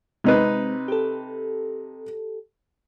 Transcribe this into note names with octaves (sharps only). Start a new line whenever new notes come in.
C3 G#3 C4 D#4 B4
G4 A4